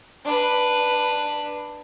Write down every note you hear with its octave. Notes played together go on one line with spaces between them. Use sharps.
D4 B4